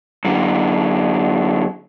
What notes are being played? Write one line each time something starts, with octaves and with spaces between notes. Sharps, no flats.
F#2 D3